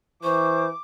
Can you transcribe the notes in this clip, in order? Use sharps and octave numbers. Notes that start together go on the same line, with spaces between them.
E3 C5 C#6 D6